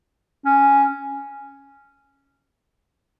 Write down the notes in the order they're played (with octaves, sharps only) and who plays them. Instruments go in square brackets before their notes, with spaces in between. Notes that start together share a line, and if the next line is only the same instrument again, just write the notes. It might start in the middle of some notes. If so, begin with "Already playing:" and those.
[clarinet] C#4